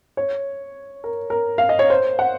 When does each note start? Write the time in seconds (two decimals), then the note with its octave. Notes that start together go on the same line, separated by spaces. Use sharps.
0.17 C#5
1.04 A#4
1.30 A#4
1.58 F5
1.69 D#5
1.79 C#5
1.90 C5
2.19 F#5